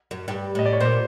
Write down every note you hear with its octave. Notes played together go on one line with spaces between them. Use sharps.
F#2
G2
A2 D#5
D5
C#5
A#2 C5